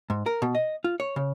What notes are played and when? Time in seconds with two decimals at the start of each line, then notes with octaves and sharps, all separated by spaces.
0.10 G#2
0.26 A#4
0.42 B2
0.55 D#5
0.84 F4
1.00 C#5
1.16 C#3